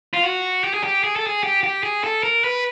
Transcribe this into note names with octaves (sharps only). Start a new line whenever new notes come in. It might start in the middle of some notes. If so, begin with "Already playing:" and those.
F4
F#4
G4
G#4
G4
G#4
A4
G#4
G4
G4
G#4
A4
A#4
B4